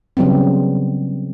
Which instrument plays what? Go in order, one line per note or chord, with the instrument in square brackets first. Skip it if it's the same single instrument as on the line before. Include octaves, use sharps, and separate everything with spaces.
[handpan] C#3 F#3 G3 B3 C4